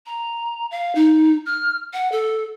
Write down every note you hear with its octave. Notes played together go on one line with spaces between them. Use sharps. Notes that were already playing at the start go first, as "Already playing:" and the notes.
A#5
F5
D#4
F6
F#5
A4